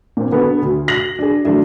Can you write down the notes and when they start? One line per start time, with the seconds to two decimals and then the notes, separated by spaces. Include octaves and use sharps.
0.17 A#2 C4
0.31 D3 B3 A4 B4
0.62 D2
0.88 A#6 F#7
1.19 D4 G#4
1.44 E3 F#3 A3 D4 E4